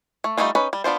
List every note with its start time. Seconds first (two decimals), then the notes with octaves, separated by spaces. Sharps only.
0.24 A3
0.38 G3 A3 C4 D#4 F4
0.55 C#4 D#4 B4
0.73 G3
0.84 B3 D4 F4 C5